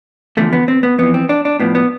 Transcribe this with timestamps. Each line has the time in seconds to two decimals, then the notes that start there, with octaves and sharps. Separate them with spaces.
0.37 E2 D3 F3 A3
0.53 B3
0.68 C4
0.83 B3
0.98 F2 E3 B3
1.14 C4
1.29 D4
1.45 D4
1.60 A2 F3 B3
1.75 B3